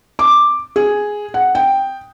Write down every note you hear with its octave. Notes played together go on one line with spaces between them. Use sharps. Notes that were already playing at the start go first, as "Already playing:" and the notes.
D6
G#4
F#5
G5